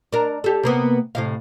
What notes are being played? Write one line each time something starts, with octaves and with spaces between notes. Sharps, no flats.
D4 A#4
G4 A4
C3 A#3 B3
A2 C3 F5